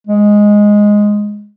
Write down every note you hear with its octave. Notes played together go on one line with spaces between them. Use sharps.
G#3